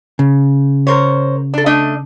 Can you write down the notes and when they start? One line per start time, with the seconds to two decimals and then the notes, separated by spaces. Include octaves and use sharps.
0.19 C#3
0.87 A#4 C5 C#5
1.54 D4 A4
1.66 A3 D4 D#5